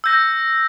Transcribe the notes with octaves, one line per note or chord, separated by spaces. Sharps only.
E6 G6 A#6